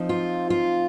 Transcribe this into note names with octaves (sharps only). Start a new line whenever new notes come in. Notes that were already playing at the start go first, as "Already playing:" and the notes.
Already playing: F3 C4 D#4
F4
F4